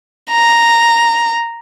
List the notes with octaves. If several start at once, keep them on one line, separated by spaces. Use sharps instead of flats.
A#5